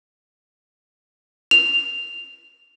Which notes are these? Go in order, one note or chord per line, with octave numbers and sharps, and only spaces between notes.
F7